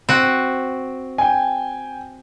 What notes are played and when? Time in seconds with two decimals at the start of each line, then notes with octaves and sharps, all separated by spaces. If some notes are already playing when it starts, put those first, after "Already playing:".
0.09 C4 F#4
1.18 G5 G#5